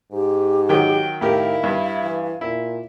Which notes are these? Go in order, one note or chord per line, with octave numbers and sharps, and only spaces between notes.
G#2 G4
D#3 F#3 G5
A2 D#3 E4 G4 A#4 F5
G2
E3
A#2 E4